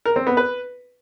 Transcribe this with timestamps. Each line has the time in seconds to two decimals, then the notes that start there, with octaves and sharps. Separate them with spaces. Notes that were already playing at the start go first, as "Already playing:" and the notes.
0.05 A#4
0.16 C4
0.27 B3
0.37 B4